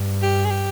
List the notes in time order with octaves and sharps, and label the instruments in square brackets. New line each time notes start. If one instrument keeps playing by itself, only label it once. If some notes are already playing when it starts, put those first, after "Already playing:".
Already playing: [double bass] G2
[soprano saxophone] G4
G#4
G4